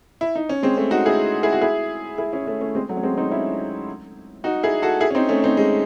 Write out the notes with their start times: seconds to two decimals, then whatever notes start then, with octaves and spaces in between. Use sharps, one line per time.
0.21 E4
0.35 D#4
0.49 C#4
0.63 G#3 C4
0.77 A3 C#4
0.91 D#4 F#4
1.05 E4 G#4
1.43 E4 G#4
1.53 F#4
1.61 E4 G#4
2.18 E4 G#4
2.33 C#4 E4
2.47 A3 C#4
2.61 A3 C#4
2.75 G#3 C4
2.89 F#3 A3
2.97 C#4
3.03 G#3 C4
3.17 C4 D#4
3.31 C#4 E4
4.44 D#4 F#4
4.63 E4 G#4
4.82 F#4 A4
5.01 E4 G#4
5.10 C#4
5.15 C4 D#4
5.29 A3 C#4
5.44 C4 D#4
5.57 G#3